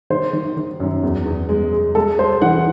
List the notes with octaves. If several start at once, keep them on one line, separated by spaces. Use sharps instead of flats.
D#3 C5
D#3
D#3
F#2
E2
E2
G#3
G#3
G#3 A4
G#3 C5
E3 F#5